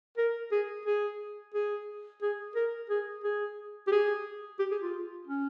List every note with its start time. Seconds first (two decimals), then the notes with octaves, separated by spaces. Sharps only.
0.17 A#4
0.52 G#4
0.86 G#4
1.54 G#4
2.22 G#4
2.55 A#4
2.90 G#4
3.24 G#4
3.87 G4
3.92 G#4
4.59 G4
4.71 G#4
4.82 F4
5.27 C#4